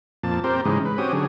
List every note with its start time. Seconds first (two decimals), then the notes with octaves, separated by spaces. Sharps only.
0.24 F2 A#2 A5
0.44 C4 G4 A#4 C5
0.65 G#2 C#3 E3 G#3 D#4
0.85 B4
0.98 C4 C#4 F#4 G4 D#6
1.13 D3 F#3 G#4